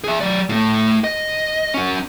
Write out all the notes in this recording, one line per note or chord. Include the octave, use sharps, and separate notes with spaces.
G#4 E5
F#3 D5
A2 A3
D#5
C#4 F#4